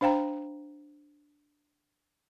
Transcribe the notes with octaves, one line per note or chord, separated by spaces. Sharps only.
D4 C5 F5 G5 A#5